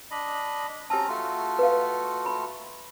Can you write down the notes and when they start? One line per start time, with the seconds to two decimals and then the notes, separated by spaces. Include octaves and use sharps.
0.11 D4 D#5 B5
0.90 C4 C#4 G4 A5 A#5
1.08 A3 F4 F#4
1.59 B4 F5
2.26 B5